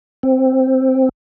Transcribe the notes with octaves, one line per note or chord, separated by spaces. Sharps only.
C4